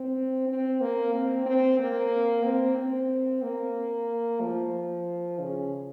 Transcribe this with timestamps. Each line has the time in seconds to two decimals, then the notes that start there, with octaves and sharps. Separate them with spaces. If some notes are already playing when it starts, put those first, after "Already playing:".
Already playing: C4
0.48 C4
0.81 A#3
1.14 C4
1.46 C4
1.79 A#3
2.45 C4
2.78 C4
3.42 A#3
4.41 F3
5.40 C#3